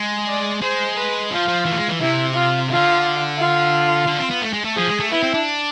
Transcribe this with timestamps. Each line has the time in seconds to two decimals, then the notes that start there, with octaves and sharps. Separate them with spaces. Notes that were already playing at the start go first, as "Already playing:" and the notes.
Already playing: G#3
0.28 D5
0.61 G#3 C5
0.97 B4
1.31 F3 F4
1.48 F3
1.65 E3
1.72 A3
1.77 G#3
1.88 E3
2.00 C3 E4
2.34 F4
2.69 D3 F4
3.38 F4
4.07 D3
4.19 C4
4.31 B3
4.42 A3
4.53 G#3
4.65 A3
4.76 F3 G#4
4.88 G#3
5.00 A3
5.11 B3 E4
5.23 C4
5.34 D4